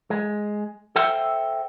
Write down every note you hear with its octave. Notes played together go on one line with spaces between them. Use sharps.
G#3
A4 C5 E5 F#5 G5